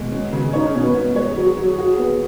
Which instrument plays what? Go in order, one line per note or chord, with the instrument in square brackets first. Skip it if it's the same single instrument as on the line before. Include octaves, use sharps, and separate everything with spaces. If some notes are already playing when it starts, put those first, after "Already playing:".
Already playing: [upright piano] B2 G#3
C#4
C#3
[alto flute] D#4 [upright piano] C#5
[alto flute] C#4
[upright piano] B2
[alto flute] B3
[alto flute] G#3 [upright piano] B3
[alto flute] G#3
[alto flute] B4 [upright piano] C#5
[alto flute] G#4
[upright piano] F#3 [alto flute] F#4
[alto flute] G#4
[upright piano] F#3
[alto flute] G#4
[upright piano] F#4
B3